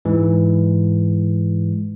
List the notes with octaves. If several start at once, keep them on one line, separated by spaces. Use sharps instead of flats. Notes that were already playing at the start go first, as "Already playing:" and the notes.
G#2 E3 G#3